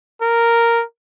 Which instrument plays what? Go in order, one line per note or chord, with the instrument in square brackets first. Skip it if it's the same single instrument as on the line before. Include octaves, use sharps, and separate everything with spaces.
[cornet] A#4